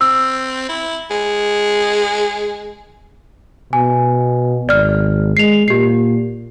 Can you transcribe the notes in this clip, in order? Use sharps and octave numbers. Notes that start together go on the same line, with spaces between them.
C4 E6
E4
G#3
B2 G#5
G#1 D5 F6
G#3 C7 F7
A#2 G4 C7